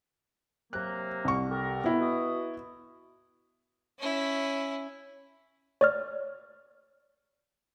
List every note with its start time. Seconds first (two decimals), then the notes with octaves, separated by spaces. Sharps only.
0.73 C3 F#3 A#3 F#6
1.25 C2 C#6
1.50 G4 A4 A#4
1.84 B3 E4
2.00 B2 F#4 D#6
3.99 C#4 E4
5.81 C#5 D5 F6